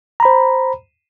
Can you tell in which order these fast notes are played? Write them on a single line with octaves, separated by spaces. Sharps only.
A#5 B5 C5